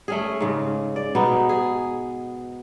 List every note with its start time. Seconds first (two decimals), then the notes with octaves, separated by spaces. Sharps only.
0.08 A3 C#4 G#4
0.40 G#2 C#3
0.96 D5
1.15 B2 B3 D#4
1.49 G#4